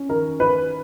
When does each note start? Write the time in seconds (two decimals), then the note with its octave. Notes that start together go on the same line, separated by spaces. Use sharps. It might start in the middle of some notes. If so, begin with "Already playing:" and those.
Already playing: C#4
0.09 D#3 A#4
0.39 E4 B4